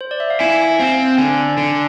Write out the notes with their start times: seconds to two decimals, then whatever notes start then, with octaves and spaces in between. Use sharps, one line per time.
0.01 C5
0.11 D5
0.20 E5
0.30 F5
0.40 E4 G#5
0.60 G#5
0.79 C4 F5
0.99 F5
1.18 D3 G#5
1.58 D3